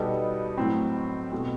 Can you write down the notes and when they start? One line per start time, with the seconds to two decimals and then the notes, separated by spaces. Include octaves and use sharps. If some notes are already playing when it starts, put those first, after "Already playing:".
Already playing: B2 G3 B3 D#4 A4
0.58 A2 F#3 C4
1.32 B2 A3 C4